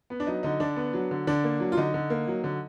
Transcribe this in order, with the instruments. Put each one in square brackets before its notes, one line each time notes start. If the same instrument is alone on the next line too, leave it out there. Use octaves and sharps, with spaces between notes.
[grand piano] B3
D4
F#3 D#4
D3 D#4
D3 D4
B3
F#3
D3
D3 D4
A#3
F#3
F4
D3 D#4
D3
A#3
F#3
D3